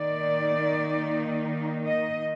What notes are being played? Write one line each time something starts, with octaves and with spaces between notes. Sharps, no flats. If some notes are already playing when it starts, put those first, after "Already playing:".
Already playing: D#3 A#3 D#4 D5
D#5